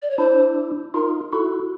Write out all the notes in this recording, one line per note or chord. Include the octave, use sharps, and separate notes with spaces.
D5
C#5
D4 E4 C5
D#4 F4 A#4
E4 F#4 A4